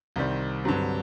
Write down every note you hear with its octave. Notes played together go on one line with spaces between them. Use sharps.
C2 C3 D#3 G3 C4
G2 D3 F#3 C4